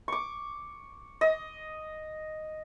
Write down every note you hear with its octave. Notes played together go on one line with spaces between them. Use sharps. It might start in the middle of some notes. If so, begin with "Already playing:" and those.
C#6 D6
D#5